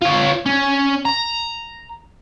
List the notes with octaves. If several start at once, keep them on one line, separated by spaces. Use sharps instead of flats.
F4 C#5
C#4
A#5